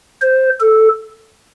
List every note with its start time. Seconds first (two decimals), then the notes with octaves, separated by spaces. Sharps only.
0.22 C5
0.61 A4